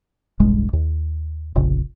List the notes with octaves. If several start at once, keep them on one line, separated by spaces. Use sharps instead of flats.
E1 B1 G2 G#3
D#2
F1 A#1 C#3